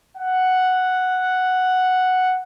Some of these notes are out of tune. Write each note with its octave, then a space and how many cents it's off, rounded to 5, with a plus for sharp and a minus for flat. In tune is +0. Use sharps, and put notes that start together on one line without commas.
F#5 +0